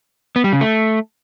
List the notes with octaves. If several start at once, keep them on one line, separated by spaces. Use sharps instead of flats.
B3
G3
C#3
A3